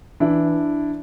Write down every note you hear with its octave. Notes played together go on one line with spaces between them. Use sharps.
E3 D4 E4